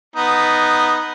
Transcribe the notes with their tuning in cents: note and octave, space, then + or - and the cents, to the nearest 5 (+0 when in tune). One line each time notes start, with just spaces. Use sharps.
B3 +0 D#4 +0